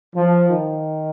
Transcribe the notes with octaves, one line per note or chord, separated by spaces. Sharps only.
F3
D#3